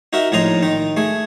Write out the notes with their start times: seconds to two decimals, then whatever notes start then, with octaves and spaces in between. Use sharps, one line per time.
0.13 D#4 F#4 A#4 E5
0.32 A#1 A2 D#4 A#5 C6 D#6
0.63 D#3 D#4
0.97 A3 G#4